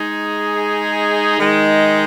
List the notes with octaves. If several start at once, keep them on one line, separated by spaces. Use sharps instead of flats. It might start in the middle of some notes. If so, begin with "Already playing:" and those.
Already playing: G#3 D#4 G#4
D#3 G#3 D#4